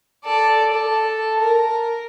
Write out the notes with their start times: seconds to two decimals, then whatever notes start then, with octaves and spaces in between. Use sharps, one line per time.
0.25 A4 D5
0.73 A4
1.40 A#4